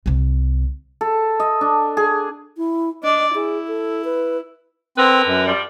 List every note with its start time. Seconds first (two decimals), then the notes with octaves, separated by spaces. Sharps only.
0.06 C2 C3
1.01 A4
1.40 D#5
1.61 D4
1.97 G#4
2.57 E4
3.03 D4 D5 D#5
3.35 E4 G#4
3.68 A4
4.05 B4
4.97 D3 C4 A#4 B4
5.27 F#2
5.46 F3 G3